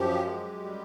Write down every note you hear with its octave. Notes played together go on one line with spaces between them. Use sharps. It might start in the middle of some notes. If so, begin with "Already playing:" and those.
Already playing: F#2 F3 G4
G#3
G3